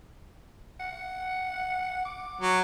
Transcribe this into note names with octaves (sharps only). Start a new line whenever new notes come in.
F#5
D6
F#3